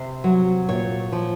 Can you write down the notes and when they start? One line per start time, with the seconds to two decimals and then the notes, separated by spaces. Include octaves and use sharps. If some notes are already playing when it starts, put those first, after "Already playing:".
Already playing: C3 C5
0.24 F#3
0.69 A#2 C#5
1.12 F3